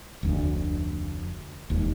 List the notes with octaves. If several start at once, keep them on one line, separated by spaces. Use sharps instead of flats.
F1 D2
E1 D#2